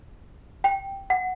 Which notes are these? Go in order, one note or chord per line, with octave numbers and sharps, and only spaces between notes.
G5
F#5